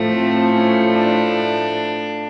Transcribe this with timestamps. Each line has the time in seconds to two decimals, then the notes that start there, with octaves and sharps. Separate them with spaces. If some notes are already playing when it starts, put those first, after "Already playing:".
Already playing: A2 F3 A3
0.13 C4
0.53 C#4
0.93 D4